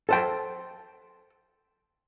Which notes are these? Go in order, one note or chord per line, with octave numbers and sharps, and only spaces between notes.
A4 C5 G5